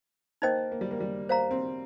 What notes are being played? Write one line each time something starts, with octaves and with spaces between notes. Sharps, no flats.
A#3 D#4 C5 D#5 G5
A#3
G3
A#3
G3
A#3 C5 F5 A#5
C4